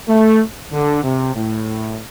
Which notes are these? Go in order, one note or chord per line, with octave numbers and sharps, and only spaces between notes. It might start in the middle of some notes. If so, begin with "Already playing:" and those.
A3
D3
C3
A2